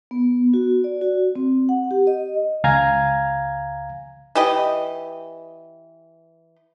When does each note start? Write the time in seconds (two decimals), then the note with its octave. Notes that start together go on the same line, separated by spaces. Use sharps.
0.11 B3
0.54 F#4
0.84 D5
1.01 F#4
1.36 C4
1.69 F#5
1.91 G4
2.07 D#5
2.64 C#2 F5 G#5 A#5 G#6
4.35 E3 G4 D#5